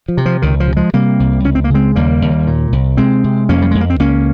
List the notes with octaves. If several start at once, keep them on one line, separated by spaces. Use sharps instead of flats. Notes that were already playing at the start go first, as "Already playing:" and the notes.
F3
C3
F3
C#2 D#3
F3
C3
F3 G#3
C3 G3 A#3
C2
C#2 C#4
C4
A#3
C#3 G#3 C4
D#2 G3 A#3
D#2
A#2
C2
C3 G#3 C4
C3
F2 A#3 C#4
G3
F2 G#3
A#3
C4
C#2 A#3 C#4